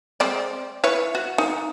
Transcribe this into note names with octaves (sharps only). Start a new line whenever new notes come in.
G#3 C4 D5
E4 B4 C#5
F#4
D#4